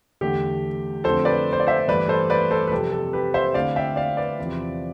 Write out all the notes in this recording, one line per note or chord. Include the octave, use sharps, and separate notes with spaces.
E2 D3 A3 G4
F2 D3 A3 C4 A4 C5
B4 D5
C5
D5
C5 E5
G2 E3 A3 B4 D5
A4 C5
B4 D5
A4 C5
B4
F2 C3 G3 A4
A4
G4 B4
C5 E5
D3 A3 C4 E4 D5 F5
E5 G5
D5 F5
B4 D5
E2 C3 F3 C4 E4